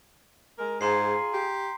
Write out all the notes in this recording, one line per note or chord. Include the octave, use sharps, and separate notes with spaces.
G#3 A#4
G#2 F4 G#4 A#5 C6 C7
G4